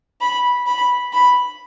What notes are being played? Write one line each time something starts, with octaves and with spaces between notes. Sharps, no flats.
B5
B5
B5